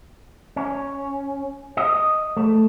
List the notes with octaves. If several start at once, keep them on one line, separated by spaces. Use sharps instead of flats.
C#4
D#5
A3